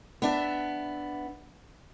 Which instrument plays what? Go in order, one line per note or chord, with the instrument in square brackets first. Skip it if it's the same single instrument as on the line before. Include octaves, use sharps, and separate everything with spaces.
[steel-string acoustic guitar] B3 D4 E5